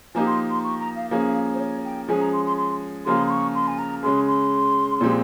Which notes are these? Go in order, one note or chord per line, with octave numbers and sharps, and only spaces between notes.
F3 A#3 D#4 G4 G#5
C6
C6
C#6
A#5
F5
F3 A#3 C#4 G#4 F5
F5
C5
C#5
G5
F3 G#3 C#4 G#4 G#5
A#5
C6
C6
C6
C#3 F3 A#3 F4 G#4 C6
C6
C#6
C6
G#5
A#5
C#3 G#3 C#4 G#4 C6
C6
A#2 F3 G#3 C4 G4